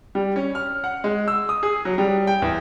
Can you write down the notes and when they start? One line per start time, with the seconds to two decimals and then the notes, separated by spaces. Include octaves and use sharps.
0.15 G3
0.36 C#4
0.55 F6
0.84 F#5
1.04 G#3
1.28 E6
1.49 D#6
1.63 G#4
1.85 F#3
1.98 G3
2.27 G5
2.42 E2